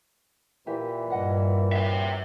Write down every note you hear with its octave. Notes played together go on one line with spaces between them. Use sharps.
A#2 E3 G4 E5 G#5
G2 D#5 F#5 G5
C#4 F#4 C5 C#5 E5